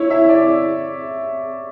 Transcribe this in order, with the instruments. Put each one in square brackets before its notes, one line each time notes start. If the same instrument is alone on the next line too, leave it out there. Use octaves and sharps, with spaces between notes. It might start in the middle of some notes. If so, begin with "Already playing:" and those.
Already playing: [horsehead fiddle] E4 [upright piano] C#5
[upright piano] E5
D5